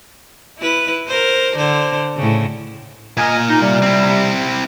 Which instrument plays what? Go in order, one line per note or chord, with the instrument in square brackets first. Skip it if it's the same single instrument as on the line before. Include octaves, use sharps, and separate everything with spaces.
[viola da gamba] E4 B4
A#4 C5
D3 C5
A2 C#3
[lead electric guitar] A#2 A#4 [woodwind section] D#5 G#5
[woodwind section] D#4
C3 G3
[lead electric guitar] C4 E4